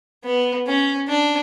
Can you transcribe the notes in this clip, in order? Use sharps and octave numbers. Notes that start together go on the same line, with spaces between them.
B3
C#4
D4